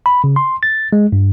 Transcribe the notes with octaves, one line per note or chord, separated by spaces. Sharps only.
B5
C#3
C6
A6
G#3
G2